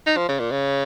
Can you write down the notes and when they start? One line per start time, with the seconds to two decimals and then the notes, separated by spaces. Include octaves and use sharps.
0.07 D#4
0.17 F3
0.29 C#3
0.40 A#2
0.51 C#3